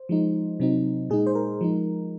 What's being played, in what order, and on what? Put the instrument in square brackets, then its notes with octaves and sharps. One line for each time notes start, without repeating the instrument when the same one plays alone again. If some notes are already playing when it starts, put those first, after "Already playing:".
Already playing: [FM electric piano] C5
F3 G#3 D#4
C3 F#3 C4 D#4
A#2 G#3 D#4 G#4
C5
A#4
F3 G#3 D#4